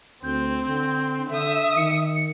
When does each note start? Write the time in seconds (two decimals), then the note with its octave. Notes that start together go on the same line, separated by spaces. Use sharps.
0.24 D2 C4 G6
0.66 D3 G6
1.30 D3 E5 D#6
1.77 D#3 C#7